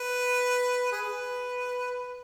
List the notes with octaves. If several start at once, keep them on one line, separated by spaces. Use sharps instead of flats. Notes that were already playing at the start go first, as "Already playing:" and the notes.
Already playing: B4
G#4 B4